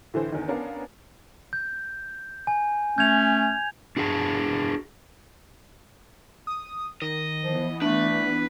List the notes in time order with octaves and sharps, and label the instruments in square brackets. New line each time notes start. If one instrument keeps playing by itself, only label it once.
[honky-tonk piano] A2 D3 E3 C5
E2 D3 D#3
B3 C#4 D4 A#4 F5
[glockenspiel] G6
G#5
[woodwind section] A3 C#4 [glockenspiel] G6 G#6 F7
[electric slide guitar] D4 F#4 G#4 F5 A5
[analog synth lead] D#6
[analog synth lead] D#3 [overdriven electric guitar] D#5
[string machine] E3 B3 [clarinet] F3
[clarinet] A3 [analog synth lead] D4 [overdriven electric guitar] B4